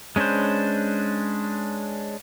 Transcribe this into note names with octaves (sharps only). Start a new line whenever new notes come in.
G#3 C#4 D4 B4 C5